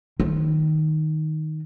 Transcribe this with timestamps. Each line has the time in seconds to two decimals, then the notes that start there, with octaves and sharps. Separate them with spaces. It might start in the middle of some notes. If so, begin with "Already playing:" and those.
0.20 D#3